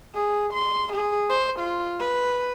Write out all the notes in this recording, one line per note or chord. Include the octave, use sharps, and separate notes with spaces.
G#4
C6
G#4
C5
F4
B4